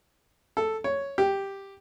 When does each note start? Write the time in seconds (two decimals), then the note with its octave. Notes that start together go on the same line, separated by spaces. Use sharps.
0.57 A4
0.84 C#5
1.18 G4